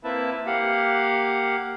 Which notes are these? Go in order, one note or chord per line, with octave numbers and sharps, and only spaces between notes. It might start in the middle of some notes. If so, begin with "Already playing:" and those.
A#3 C4 E4 B4 E5 A5
A#3 G4 F5 F#5